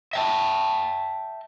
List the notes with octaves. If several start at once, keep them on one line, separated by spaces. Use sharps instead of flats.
E5 G5 A5